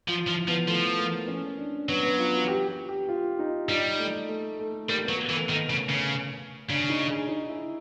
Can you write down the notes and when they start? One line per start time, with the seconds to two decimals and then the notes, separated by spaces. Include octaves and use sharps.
0.08 F3 F4
0.28 F3 E4
0.48 F3 B3
0.68 F3 A3
0.99 A#3
1.28 C#4
1.58 D4
1.89 F#3 B3
2.03 B3
2.19 F4
2.34 F#4
2.48 G4
2.68 G4
2.89 G4
3.09 F4
3.39 D#4
3.69 G3 D#4
3.99 A3
4.29 A3
4.59 A3
4.89 G3 A#3
5.05 F#3 B3
5.19 A#3
5.29 E3
5.34 A3
5.49 D#3 A3
5.70 C#3
5.89 C#3
6.70 C#3 D4
6.90 D#4
7.10 G#4
7.29 D#4
7.49 E4